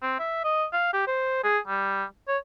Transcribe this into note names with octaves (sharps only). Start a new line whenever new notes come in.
C4
E5
D#5
F5
G4
C5
G#4
G3
C#5